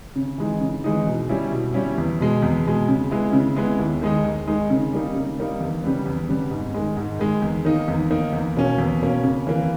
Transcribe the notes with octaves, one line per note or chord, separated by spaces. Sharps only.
C#3
E3 G#3 D#4
C#3
E3 G#3 D#4
B2
G3 C#4 E4
B2
G3 C#4 E4
E2
B2 G#3
E2
B2 G#3
C#3
G#3 B3 E4
C#3
G#3 B3 E4
D#2
D#3 G#3 D#4
D#2
D#3 G#3 D#4
C#3
G3 A#3 D#4
C#3
G3 A#3 D#4
E2
C#3 G3 B3
E2
C#3 G3 B3
G#2
D#3 G#3
G#2
D#3 G#3
E2
D#3 A#3 D#4
E2
D#3 A#3 D#4
E2
B2 A#3 C#4
E2
B2 A#3 C#4
C#3
E3 A#3